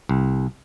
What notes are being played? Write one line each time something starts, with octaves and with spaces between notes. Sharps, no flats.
C2